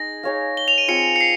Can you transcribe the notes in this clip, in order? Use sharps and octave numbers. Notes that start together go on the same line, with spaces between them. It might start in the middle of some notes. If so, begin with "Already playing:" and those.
Already playing: D#4 G#4 A#6
D#4 G#4 C#5 F5
G7
F7
D#7
C4 F4 G#4 C#7
C#7
C7